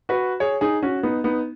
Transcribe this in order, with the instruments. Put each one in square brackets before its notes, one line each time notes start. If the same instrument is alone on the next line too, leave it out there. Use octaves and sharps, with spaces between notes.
[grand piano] F#4 B4
G#4 C#5
D#4 G#4
C#4 F#4
B3 D#4
B3 D#4